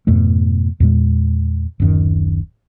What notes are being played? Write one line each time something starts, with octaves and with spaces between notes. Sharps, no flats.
F2 G#2 B2 A3
E2 A#2 G#3
D1 F#2 D#3